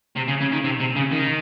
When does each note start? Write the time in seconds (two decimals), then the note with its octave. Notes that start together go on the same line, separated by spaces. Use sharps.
0.16 C3
0.28 C#3
0.41 C#3
0.52 D#3
0.64 C3
0.80 C3
0.96 C#3
1.12 D#3